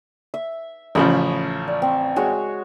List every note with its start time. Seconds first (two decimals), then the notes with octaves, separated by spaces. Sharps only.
0.34 E5
0.95 A1 C#3 F3 C#5 B5 D#6
1.68 D5
1.82 C4
2.16 G#3 F#4 C#5